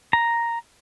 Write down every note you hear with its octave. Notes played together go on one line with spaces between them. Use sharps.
A#5